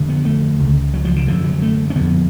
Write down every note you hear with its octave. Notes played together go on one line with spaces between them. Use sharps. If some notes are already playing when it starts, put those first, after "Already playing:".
Already playing: F2 D3
B3
A3
C#2 C#3
F#3
F3
D3
F#2 D3 F3
F#3
A3
C#4
F2 D3 B3